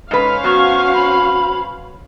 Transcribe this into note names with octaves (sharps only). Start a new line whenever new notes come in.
G#2 C#4 B4 C5 F5
F#3 B3 F#4 C#6
B5